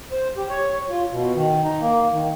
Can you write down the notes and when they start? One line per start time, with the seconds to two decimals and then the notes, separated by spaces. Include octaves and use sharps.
0.11 C5
0.37 G4
0.49 C#5
0.90 F4
1.11 B2
1.35 D#3
1.63 D#4
1.81 A#3
2.12 D#3